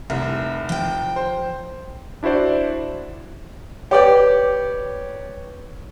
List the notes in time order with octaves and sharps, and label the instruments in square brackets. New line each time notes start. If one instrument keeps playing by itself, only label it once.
[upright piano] F1 C2 [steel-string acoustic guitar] E5
[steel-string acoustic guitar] F3 G5
[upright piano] C5
[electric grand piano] D4 E4 F#4 C5 D5
[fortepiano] G4 D5 G5 [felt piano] B4 C#5